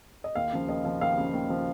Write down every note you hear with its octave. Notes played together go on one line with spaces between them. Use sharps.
D#5
D#2 F5
C#3 F3
D#2 D#5
C#3 F3 F5
D#2 F5
C#3 F3
D#2
C#3 F3